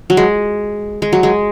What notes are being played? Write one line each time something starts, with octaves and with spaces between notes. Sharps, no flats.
F#3
G#3
G#3
F#3
G#3